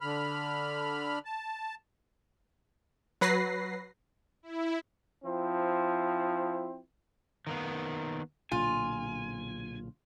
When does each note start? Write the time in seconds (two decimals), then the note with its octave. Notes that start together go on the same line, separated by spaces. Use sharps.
0.01 D3 B5 F6
1.25 A5
3.21 F#3 B4 A#6 C7
4.43 E4
5.24 F3 C4 E4
7.47 D#3 A#3 B3
8.52 B1 A#2 D3 F4 G#5